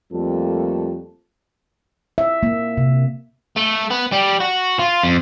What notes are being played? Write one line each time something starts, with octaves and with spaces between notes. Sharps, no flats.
F2 G3 A3 A#3 A4
E5
A#3
C3
A3
B3
G3
F#4
F4
F2